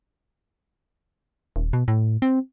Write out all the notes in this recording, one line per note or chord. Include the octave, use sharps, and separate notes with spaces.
D#1
B2
A2
C4